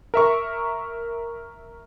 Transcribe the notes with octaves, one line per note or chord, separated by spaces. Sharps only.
A#4 E5 C#6